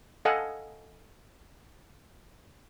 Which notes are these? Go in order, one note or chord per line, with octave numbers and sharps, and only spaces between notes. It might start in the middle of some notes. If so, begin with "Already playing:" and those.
A4 D#5 F5 F#5 G#5